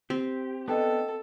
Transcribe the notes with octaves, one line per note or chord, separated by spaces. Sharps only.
C4 G4
B3 D4 A4 D#5 G5 A5